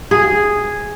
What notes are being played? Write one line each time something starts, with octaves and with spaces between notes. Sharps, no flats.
G#4